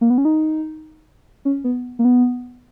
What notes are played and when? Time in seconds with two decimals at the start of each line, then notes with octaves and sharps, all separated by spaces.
0.01 A#3
0.10 B3
0.18 C#4
0.25 D#4
1.45 C#4
1.64 B3
1.99 A#3
2.05 B3